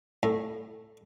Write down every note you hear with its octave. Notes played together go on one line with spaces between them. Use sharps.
A2